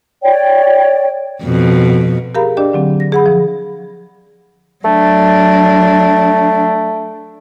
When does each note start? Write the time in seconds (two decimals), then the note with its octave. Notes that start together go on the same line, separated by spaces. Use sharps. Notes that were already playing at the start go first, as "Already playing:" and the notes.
0.22 C#5 D5 G5
1.43 F2 B2
2.35 G4 G#4 A#4 F5 A#5 B5
2.57 D4 G4 D5 D#5 G5
2.73 D3 F#3 C4
3.00 A#6
3.12 G#4 F#5 B5
3.26 F3
4.85 F#3 A3 D4